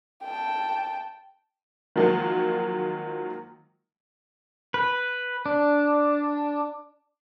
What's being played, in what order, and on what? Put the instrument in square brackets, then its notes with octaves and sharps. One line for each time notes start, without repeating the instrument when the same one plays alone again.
[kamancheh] G5 A5
[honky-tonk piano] D#3 F3 F#3 G#3 A#3 F4
[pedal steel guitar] B4
D4